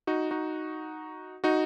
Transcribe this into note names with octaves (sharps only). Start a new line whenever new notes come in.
D#4 F#4
D#4 F#4
D#4 F#4